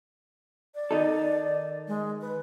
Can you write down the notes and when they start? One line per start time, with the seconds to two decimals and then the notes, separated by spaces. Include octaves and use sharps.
0.75 D5
0.91 D#3 D#4 A4
1.88 G#3
2.21 B4